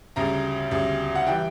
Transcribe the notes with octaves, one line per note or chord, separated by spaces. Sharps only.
D2 C#3 G3 A#5
D2 C#3 G3
F#5
E3 G3 G5